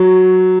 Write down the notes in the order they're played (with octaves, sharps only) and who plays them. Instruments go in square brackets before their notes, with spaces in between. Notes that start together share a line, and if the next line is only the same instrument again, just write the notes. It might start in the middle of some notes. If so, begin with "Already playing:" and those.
Already playing: [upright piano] F#3